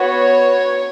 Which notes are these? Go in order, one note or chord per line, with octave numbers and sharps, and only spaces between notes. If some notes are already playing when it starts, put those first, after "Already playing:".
Already playing: B3 F#4 C#5